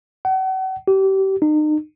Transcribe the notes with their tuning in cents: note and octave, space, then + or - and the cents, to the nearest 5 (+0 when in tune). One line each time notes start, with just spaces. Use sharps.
F#5 +40
G4 -30
D#4 -35